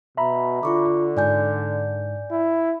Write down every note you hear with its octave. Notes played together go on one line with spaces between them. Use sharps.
B2 E5 A#5 B5
D3 F4 C#6 D6
G#2 D5 G#5 G6
E4